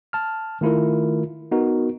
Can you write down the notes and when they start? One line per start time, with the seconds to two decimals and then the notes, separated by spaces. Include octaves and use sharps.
0.13 A5 F6
0.61 D#3 A3 E4 F4 A#4
1.51 B3 D#4 F#4 A#4